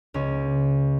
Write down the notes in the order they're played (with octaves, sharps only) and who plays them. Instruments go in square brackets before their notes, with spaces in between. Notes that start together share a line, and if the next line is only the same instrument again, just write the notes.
[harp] C#2 C#4